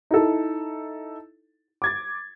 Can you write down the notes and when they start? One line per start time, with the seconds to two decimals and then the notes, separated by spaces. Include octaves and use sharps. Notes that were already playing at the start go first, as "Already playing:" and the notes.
0.11 D#4 E4 A4
1.82 D6 G#6 A6